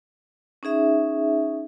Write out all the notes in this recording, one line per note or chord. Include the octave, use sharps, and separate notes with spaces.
C#4 D#4 G#4 E5